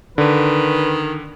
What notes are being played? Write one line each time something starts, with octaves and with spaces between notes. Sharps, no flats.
D3 D#3 B4